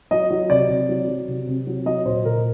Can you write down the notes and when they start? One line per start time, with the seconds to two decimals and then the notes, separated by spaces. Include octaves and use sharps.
0.11 F#3 D#5
0.30 F#3
0.50 C3 D5
0.69 C3
0.89 F#3
1.08 F#3
1.28 C3
1.47 C3
1.67 F#3
1.86 F#3 D#5
2.06 A#2 C5
2.25 A#2 A#4